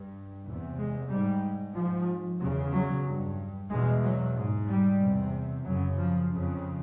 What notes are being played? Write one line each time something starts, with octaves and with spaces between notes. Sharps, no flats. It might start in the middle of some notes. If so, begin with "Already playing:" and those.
Already playing: G2
E2 C3
G#3
G#2 G3
G#2 F3
E2 C#3 F#3
F#3
G2
E2 B2 G#3
F#3
G#2
G3
E2 C3
F#2 C#3 F#3
F3
F2 C#3